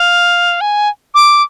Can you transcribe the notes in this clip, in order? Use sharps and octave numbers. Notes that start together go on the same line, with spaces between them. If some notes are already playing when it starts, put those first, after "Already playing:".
Already playing: F5
G#5
D6